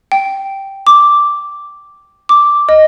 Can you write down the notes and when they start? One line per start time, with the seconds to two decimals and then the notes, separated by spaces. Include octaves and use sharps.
0.12 G5
0.87 D6
2.29 D6
2.69 D#5